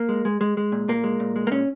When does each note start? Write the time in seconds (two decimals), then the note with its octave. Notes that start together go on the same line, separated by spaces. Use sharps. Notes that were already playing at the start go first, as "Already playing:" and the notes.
Already playing: A#3
0.09 G#3
0.25 G#3
0.41 G#3
0.57 G#3
0.72 A#2
0.88 A#2 A#3
1.04 G#3
1.20 A#2
1.36 G#3
1.47 A#3
1.51 A#2 C#4